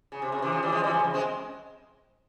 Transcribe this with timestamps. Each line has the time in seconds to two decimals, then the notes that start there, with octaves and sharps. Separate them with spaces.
0.12 C#3
0.22 C3
0.32 C#3
0.42 C3 E3
0.52 C#3 F3
0.63 E3 G3
0.72 F3 G#3
0.83 E3 G3
0.93 C#3 F3
1.04 C#3
1.14 G#3 C4